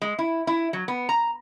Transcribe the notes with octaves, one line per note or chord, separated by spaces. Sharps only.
G#3
E4
E4
F#3
B3
A#5